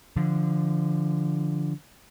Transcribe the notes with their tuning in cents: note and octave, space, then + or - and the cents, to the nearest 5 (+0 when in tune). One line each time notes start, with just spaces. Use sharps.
D3 +0 F3 -20